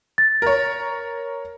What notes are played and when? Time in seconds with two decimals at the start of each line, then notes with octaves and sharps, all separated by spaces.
0.18 A6
0.42 A#4 C#5